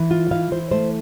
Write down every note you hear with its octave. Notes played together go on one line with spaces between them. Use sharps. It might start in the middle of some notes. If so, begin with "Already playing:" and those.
Already playing: E3
F4
E3 F5
E3 C5
A3 C5